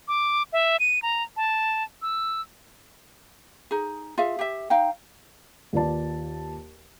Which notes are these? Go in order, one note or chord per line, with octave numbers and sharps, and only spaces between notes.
D6
E5
D#7
A#5
A5
E6
D#4 G#4
F4 G#4 E5 F5
G4 E5
D#4 F5 G5
D#2 F4 B4 D5 A5